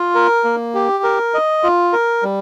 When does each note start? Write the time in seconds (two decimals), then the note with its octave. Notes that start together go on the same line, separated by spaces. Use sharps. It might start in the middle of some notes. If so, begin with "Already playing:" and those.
Already playing: F4
0.15 A#4
0.44 A#3
0.75 G4
1.04 A#4
1.34 D#5
1.63 F4
1.93 A#4
2.23 G3